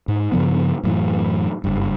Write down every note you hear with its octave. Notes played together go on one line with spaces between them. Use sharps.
G#2
G2 C#3 F3 B3
F#2 A2 E3
F#1 G2